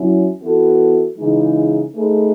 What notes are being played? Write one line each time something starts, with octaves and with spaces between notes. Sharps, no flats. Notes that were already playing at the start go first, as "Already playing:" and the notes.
Already playing: F#3 C#4 E4
E3 B3 F#4 A4
C#3 E3 G#3 D#4
A3 D#4 G#4 B4